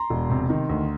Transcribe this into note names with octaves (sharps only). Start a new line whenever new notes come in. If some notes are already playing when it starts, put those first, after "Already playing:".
Already playing: A#5 C6
E1
C3
D#3
D2